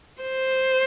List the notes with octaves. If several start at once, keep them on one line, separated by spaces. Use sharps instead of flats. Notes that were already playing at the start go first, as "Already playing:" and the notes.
C5